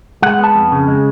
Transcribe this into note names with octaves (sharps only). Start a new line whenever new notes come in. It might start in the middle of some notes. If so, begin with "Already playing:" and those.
G#3 F#5
F#5
B3 A5
F2
C#3
G#3